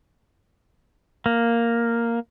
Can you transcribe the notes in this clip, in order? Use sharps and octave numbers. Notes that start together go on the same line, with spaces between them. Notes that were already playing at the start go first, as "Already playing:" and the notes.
A#3